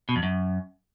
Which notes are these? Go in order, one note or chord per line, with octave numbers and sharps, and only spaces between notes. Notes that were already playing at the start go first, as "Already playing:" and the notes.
B2
F2
F#2